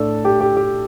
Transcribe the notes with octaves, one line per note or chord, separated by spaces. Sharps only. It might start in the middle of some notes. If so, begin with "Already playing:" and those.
Already playing: A2 A3 D4 A4
G4
G4
G4